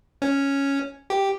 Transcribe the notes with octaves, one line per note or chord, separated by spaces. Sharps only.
C#4
G4